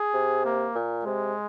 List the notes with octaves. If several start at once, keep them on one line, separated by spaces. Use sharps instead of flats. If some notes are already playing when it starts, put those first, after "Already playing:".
Already playing: G#4
C3
A#3
A#2
C3 G#3